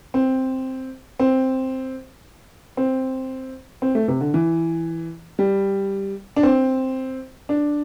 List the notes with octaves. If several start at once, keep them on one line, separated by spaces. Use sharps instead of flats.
C4
C4
C4
C4
A3
C3
D3
E3
G3
D4
C4
D4